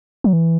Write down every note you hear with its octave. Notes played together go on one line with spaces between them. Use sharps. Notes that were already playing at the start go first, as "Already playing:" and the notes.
F#3
E3